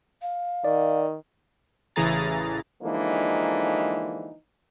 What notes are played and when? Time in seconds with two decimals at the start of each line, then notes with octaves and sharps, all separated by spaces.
0.22 F5
0.64 D#3 D5
1.96 A1 C#3 E3 G#4 A#5 A6
2.82 D3 E3 F3 G#3 A#3 D#4